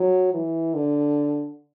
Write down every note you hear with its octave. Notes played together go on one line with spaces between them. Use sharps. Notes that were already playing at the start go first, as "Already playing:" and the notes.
Already playing: F#3
E3
D3